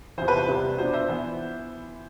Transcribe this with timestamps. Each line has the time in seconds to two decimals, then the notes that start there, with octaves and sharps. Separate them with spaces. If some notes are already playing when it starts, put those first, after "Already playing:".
0.18 E2 C3 E3 C5
0.28 B4
0.37 C5
0.48 E2 C3 G3
0.78 B2 B3 D4 C5
0.93 C5 E5
1.09 E3 B3